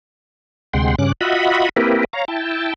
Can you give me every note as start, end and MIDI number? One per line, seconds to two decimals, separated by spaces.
0.74 0.95 38
0.74 0.95 48
0.74 0.95 56
0.74 0.95 78
0.74 0.95 79
0.74 0.95 84
0.99 1.12 43
0.99 1.12 49
0.99 1.12 61
0.99 1.12 86
0.99 1.12 90
1.21 1.69 65
1.21 1.69 66
1.21 1.69 75
1.21 1.69 76
1.21 1.69 78
1.21 1.69 83
1.76 2.05 58
1.76 2.05 60
1.76 2.05 64
1.76 2.05 67
1.76 2.05 70
1.76 2.05 71
2.13 2.25 73
2.13 2.25 77
2.13 2.25 82
2.28 2.74 64
2.28 2.74 79
2.28 2.74 81